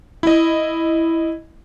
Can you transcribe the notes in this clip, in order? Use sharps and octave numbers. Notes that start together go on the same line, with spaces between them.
E4 D#5